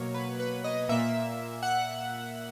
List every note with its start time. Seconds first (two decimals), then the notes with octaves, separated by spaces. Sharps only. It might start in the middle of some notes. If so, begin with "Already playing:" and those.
Already playing: B2 F#3 A#3 C#5
0.14 B4
0.40 B4
0.64 D#5
0.89 A#2 A#3 E5
1.63 F#5